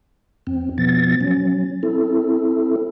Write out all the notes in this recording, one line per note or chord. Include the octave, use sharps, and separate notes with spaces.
F2 C4
B2 F3 B3 A6
F#3 C#4
C4 E4 A4